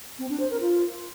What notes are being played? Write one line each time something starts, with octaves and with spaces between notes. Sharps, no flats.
C4
D4
C5
A#4
F4